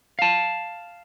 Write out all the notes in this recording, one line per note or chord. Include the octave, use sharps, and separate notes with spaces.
F5 A5